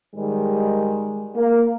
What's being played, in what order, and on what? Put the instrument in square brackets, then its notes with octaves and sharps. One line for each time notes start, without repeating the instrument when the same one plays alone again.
[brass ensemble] G#2 D#3 G3 G#3
A#3